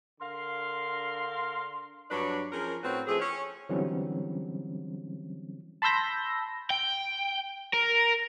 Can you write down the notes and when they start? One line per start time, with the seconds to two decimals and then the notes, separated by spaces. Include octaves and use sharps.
0.21 D3 A#4 F5 C6
2.11 G2 F#3 D4 B4 C#5 D5
2.52 F3 C#4 G#4 A#4
2.83 A2 C4 C#4 F#4 B4
3.07 F3 A3 C4 G#4
3.20 C#4 C#5
3.69 D3 E3 F#3 G3 C4 C#4
5.82 A5 B5 C6 E6 G6 A#6
6.70 G5
7.74 A#4